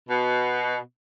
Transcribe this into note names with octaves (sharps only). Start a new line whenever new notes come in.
B2